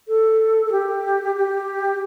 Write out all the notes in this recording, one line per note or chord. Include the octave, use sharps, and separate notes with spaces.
A4
A4
G4
G4